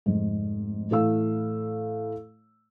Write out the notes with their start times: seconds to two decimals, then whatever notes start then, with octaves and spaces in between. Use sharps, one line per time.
0.06 F1 G#2
0.91 A2 E3 A3 F5 E6